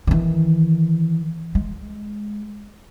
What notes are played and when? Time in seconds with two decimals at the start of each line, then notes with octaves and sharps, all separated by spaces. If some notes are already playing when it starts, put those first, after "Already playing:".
0.07 D#3 E3
1.55 G#3